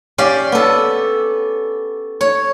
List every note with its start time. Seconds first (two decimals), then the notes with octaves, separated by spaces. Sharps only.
0.18 C#4 G4 D5 F5
0.52 B3 A4
2.21 C#5